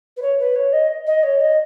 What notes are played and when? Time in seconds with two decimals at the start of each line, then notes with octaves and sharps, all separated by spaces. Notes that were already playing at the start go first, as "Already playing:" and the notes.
0.17 B4
0.22 C#5
0.39 B4
0.55 C#5
0.73 D#5
1.07 D#5
1.23 C#5
1.41 D#5